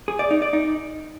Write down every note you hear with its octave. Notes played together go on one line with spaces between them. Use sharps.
G#4
D5
D#4
D5
D#4